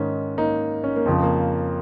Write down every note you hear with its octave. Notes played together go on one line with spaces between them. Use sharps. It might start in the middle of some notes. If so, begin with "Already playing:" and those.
Already playing: G#2 D#3 C#4
A#3 D#4
C#4
A#3
F2 C#3 F3
A#3